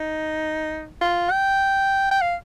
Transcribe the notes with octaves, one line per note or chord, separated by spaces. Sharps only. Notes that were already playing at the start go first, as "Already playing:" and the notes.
Already playing: D#4
F4
G5
G5
F5